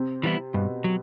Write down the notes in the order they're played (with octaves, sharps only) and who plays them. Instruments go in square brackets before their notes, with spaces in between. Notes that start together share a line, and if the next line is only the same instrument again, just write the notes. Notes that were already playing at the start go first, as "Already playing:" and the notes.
Already playing: [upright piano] C3 C4
[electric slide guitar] E3 G3 B3 E4
[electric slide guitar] G2 [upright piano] B2 B3
[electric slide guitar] F#3